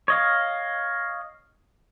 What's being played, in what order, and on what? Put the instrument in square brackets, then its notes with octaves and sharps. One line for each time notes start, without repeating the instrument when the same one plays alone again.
[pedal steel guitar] C#5 D#5 F5